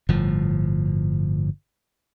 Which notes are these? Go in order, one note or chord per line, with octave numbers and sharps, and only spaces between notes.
G1 A2 F3